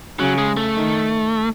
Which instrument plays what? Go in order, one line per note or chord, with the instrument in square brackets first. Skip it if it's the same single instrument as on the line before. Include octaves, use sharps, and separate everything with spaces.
[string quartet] C#3 [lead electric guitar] F#3
[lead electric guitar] G#3
A3
[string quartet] D#3